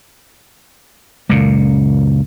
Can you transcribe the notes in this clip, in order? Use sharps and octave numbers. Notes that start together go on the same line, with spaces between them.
C#2 F#2 A#2